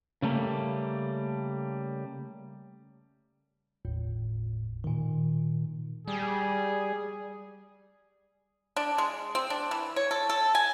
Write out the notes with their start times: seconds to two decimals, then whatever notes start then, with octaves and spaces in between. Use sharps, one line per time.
0.22 C#3 G3 A3 A#3
3.85 G1 D#2 A2
4.84 A#2 D#3
6.07 G3 G#4
8.76 D4
8.98 G#3
9.35 C4
9.50 D4
9.71 E3
9.96 C#5
10.11 A4
10.29 A4
10.55 G#5